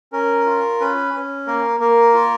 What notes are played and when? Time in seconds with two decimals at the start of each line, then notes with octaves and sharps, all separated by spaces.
0.12 C#4 A#4
0.46 F4
0.80 C#4 B4
1.14 C#4
1.47 A#3 A#4
1.80 A#3 A#4
2.14 F4